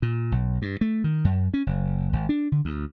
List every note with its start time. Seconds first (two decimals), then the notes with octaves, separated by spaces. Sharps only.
0.02 A#2
0.32 B1
0.62 G2
0.81 A3
1.04 D#3
1.24 F#2
1.54 C#4
1.67 F#1
2.13 G#1
2.29 D4
2.52 D3
2.65 D2